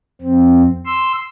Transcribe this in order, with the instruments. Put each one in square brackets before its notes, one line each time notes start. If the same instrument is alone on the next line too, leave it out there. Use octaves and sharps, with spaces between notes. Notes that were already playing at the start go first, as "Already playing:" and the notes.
[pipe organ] F2 C4
C6 E6